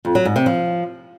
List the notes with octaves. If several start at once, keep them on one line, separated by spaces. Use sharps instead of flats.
F2
F#3
G#2
C3
F3